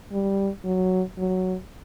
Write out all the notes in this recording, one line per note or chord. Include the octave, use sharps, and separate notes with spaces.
G3
F#3
F#3